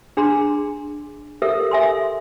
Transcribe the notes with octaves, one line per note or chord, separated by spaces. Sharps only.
D4 G#4 A#5 C6
G4 A4 A#4 E5
A4 E5 G#5 C6